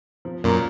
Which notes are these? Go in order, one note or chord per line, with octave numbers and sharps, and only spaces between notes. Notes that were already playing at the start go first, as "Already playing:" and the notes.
F3
F#2 A#2 A#3